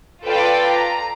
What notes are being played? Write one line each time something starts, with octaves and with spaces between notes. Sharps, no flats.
F4 A4 B4 D5 F5 G5
A#5